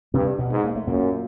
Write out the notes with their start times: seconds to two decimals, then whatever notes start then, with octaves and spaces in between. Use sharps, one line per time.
0.14 G2 C3 C4
0.38 B2 B3
0.51 G#2
0.64 A#3
0.76 A3
0.87 F#2 A#2 A#3